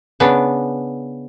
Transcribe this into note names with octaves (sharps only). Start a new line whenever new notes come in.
C#3 B3 D4